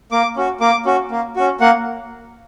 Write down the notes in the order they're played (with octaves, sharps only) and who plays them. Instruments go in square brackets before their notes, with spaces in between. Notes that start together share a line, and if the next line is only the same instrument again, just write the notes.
[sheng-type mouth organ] A#3 D6
C#4 F#4
A#3 D6
C#4 F#4
A#3
C#4 F#4
A#3 F#5